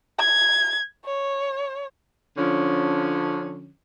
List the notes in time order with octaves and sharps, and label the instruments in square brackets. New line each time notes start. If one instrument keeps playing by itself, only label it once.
[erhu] G#6
C#5
[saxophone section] D3 F3 C#4